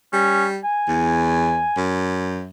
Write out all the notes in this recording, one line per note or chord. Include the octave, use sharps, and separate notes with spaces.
G3 C#4
G#5
E2
F#2